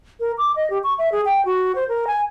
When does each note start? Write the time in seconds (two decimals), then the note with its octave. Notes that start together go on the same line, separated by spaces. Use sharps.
0.20 A#4
0.38 D6
0.56 D#5
0.70 G4
0.84 C#6
0.99 E5
1.12 G#4
1.25 G5
1.45 F#4
1.75 C5
1.88 A#4
2.07 G#5